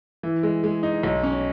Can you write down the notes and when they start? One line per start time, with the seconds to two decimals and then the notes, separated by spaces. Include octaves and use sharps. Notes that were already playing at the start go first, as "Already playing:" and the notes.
0.23 E3
0.43 G#3
0.64 G#3
0.83 D#4
1.03 B1
1.23 C#4